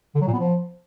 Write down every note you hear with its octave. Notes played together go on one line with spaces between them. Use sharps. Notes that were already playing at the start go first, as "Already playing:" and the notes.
D3
F#3
A#2
B3
F3